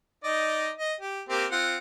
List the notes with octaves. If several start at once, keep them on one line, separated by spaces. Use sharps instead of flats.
D#4 D5 D#5
D#5
G4
A#3 C4 G4
C4 F4 F#5